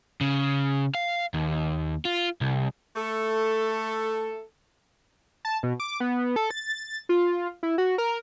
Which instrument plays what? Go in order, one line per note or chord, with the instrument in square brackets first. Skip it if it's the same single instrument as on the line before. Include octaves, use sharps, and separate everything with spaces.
[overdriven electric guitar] C#3
F5
D#2
F4
C2
[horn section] A3 A4
[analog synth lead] A5
B2
D6
B3
A4
A6
F4
E4
F#4
A#4